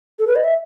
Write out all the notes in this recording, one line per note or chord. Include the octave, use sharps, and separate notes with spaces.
A4
B4
D#5
E5